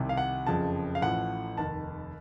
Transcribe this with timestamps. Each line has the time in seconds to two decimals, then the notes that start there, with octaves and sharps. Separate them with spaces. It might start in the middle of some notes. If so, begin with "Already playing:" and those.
Already playing: C2 C3 D#3
0.09 F5
0.17 F#5
0.46 F#1 F2 C#3 F3 A5
0.95 F5
1.01 A1 A2 F3 F#5
1.57 F1 D#2 D#3 A5